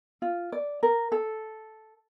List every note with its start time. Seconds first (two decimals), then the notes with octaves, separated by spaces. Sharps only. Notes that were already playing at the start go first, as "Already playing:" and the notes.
0.22 F4
0.52 D5
0.83 A#4
1.12 A4